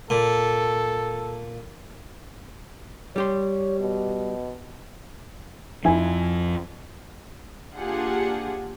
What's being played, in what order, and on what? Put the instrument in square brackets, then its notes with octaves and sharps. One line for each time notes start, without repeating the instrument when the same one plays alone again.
[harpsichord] A#2 [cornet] A4
[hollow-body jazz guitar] G3 G4 C6 [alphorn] C#5
[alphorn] B2
[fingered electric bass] F2 F3 [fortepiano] E4 G#5
[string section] A#3 D4 F4 G4 G#4 F#5